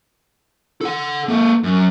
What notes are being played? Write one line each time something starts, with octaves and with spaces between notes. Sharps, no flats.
A4 F#5
A#3 A4
F#2